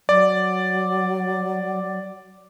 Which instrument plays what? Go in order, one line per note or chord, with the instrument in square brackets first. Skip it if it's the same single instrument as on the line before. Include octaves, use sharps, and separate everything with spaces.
[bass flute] F#3 [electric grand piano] D5